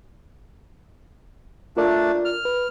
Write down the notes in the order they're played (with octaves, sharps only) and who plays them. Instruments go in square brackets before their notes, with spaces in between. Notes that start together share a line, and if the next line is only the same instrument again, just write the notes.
[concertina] A3 D4 [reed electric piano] F4 A#4 D5
[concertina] F6
[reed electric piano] B4